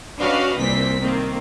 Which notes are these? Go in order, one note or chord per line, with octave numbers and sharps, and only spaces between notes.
C#4 D4 F#4 B4 D#5 F5
C2 A#2 C4 B6
D#3 A#3 C4